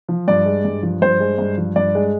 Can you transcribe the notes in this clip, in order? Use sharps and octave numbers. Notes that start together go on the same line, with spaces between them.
F3
G2 D5
G#3
G2
F3
G2 C5
G#3
G2
F3
G2 D5
G#3